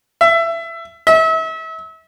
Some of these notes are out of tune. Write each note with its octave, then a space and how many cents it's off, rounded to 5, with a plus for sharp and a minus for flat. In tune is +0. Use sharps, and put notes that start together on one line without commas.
E5 +20
E5 -35